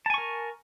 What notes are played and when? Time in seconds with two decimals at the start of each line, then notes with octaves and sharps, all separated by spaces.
0.06 A5
0.10 G#5
0.14 C#6
0.18 A#4